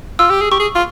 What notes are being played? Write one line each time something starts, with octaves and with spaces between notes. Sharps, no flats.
F4 E6
G4
G#4
G4 C#6
G#4
F4